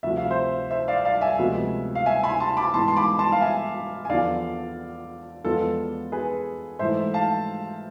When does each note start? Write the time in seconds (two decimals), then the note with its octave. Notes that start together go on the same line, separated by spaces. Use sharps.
0.03 D2 C3 F3 E5
0.17 F5
0.31 C5 E5
0.71 C5 E5
0.88 D5 F5
1.05 D5 F5
1.21 E5 G#5
1.38 D2 C3 F3 G#3 B3
1.95 F5
2.06 E5 G#5
2.23 G#5 B5
2.40 A5 C6
2.57 B5 D6
2.74 G#2 E3 B3 A5 C6
2.88 C6
2.96 B5 D6
3.19 A5 C6
3.32 F5
3.41 E5 G#5
4.05 G#5
4.09 E2 D3 F3 B3 D5 F5
5.44 E2 D3 F3 G#3 B3 F4 A4
6.12 G#4 B4
6.79 G#2 E3 A3 C5 E5
7.14 F5 A5